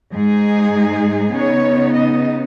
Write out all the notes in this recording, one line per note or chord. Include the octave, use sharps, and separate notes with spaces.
G#2 G#3 D#4 G#4
C#3 B3 D#4 C#5
D#5